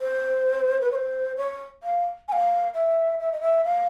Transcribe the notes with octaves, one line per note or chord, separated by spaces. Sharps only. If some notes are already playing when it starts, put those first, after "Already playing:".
C5
B4
C#5
C5
C#5
F5
G#5
F5
E5
E5
D#5
E5
F5